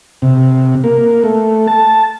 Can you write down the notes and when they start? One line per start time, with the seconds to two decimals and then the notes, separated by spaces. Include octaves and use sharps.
0.22 C3
0.84 A#3
1.24 A3
1.67 A5